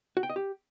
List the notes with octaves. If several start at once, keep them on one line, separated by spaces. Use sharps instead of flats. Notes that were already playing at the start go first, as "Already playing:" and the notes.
F#4
G5
D#5
G4